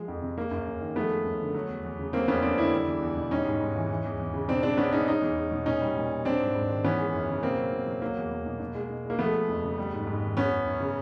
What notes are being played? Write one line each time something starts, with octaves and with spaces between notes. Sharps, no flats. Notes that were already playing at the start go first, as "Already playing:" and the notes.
Already playing: F3 G#3
F2
C3
G#3 A#3
F#2
F#2
D#3
F3 A3 B3
G#3
F#2
D3
F#3
E2
E2
C#3
F#3 A#3 C4
F2 B3 C#4
F2 C4 D4
D3 D4 E4
G3
E2
E2
B2
G3 C#4 D#4
G#2
G#2
E3
E3
E2
E2
C#3
B2 C4 D4
G#3 C4 D4
B2 B3 C#4
G#3 C#4 D#4
G#3 C#4 D#4
E2
E2
B2
A#2 C#4 D#4
G3
A#2
G3
F#3 C4 D4
G#2
G#2
D#3
E3 B3 C#4
G#3
F#2
C#3
B2 A#3 C4
F#3
B2
F#3
F#3 A#3
E2
E2
B2
B2
G#3
B2
G#3 A#3
F3 A3 B3
G#3
F2
C#3
G3
G#2
G#2
D#3
F#3 B3 C#4
F#2
F#2
C#3